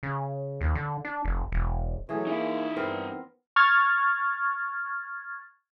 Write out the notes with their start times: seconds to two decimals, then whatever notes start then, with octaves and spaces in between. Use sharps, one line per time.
0.03 C#3
0.61 D#2
0.75 D3
1.05 D4
1.25 F1
1.52 E1
2.09 E3 F#3 A3 C#4 G#4
2.27 A#3 D#4 E5
2.76 G2 B3 C4 A#4
3.56 C#6 F6 G#6 A6